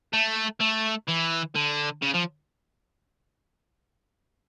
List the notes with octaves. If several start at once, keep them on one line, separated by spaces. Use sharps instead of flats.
A3
A3
E3
D3
C#3
F3